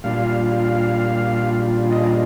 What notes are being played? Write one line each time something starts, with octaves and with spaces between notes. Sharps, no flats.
A#2 G3 D4 F4 F5
F5
D#5